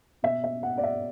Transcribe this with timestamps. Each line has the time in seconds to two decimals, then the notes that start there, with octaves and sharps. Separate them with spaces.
0.23 B2 E5
0.44 E5
0.63 F#5
0.78 D5
0.83 E5